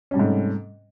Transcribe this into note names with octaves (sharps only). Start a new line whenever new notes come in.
G#2 C3 G3 A3 C#4